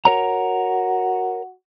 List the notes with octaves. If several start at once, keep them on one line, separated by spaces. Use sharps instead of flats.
F#4 A#4 C#5 A#5